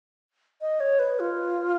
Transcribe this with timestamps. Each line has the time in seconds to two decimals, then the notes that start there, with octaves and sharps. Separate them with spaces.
0.61 D#5
0.80 C#5
0.99 B4
1.20 F4